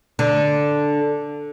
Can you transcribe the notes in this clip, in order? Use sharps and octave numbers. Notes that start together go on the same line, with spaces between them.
D3